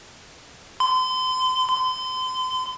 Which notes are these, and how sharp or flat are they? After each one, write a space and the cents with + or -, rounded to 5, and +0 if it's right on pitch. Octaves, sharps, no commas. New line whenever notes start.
C6 -35
C6 -35